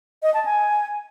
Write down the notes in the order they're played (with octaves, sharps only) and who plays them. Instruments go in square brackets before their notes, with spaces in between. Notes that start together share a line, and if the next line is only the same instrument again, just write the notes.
[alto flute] D#5
A5
G#5